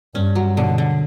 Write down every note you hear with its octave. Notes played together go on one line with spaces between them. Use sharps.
G2 C#4
F#3
B2 D3
D3